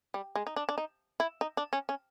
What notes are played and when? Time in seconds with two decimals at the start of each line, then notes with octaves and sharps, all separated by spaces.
0.14 G3
0.35 G#3
0.47 D#4
0.56 D4
0.69 D4
0.78 D#4
1.20 E4
1.41 D#4
1.57 D4
1.73 C#4
1.89 C#4